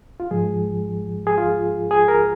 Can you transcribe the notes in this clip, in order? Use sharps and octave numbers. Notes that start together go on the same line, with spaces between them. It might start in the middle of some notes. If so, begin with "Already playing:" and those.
F4
G#2 F3 G#3 G#4
G#4
F4
G#4
A#4